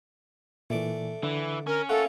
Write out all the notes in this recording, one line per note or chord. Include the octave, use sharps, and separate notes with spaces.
A#2 E3 A3 D4 D6
D3 E3
C#4 A#4
A3 A#3 F4 A4 F#5 C#6